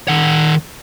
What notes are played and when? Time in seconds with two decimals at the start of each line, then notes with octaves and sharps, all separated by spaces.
0.08 D#3 F#5